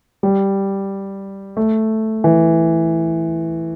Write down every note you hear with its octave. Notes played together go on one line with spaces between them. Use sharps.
G3
A3
E3